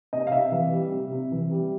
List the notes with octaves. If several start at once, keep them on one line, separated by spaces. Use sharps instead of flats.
C3 D#5
F5
C3 E5
E3
G3
C3
C3
E3
G3